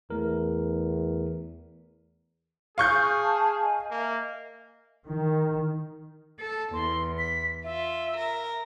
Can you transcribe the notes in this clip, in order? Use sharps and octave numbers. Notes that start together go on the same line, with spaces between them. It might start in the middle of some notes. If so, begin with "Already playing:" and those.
E2 A3 A#4
G#4 F5 C#6 G6
A5
D#5 G#5
A#3 D#5 E5
D#3
A4
E2 C6
B6
F4 E5
A#4